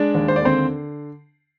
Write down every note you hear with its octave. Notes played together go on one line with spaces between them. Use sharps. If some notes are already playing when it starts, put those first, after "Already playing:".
Already playing: G#3 D4 D5
D#2
C5
D5
D3 C4 C5